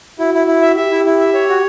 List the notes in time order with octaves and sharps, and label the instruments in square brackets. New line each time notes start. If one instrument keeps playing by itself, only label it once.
[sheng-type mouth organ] E4 [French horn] F#4
[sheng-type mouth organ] E4
E4
E5
[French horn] G4 [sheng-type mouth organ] E5
[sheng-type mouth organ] E4
E4
E5
C#5
F#4